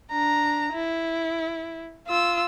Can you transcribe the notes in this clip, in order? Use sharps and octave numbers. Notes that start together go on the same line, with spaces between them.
D4 A#5
E4
F4 E6